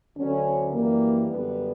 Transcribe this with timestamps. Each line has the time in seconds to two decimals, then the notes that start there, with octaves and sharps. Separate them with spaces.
0.17 D2 D3 F#3 C#4
0.72 F#2 E3 G3 A#3
1.27 F#2 D3 G3 B3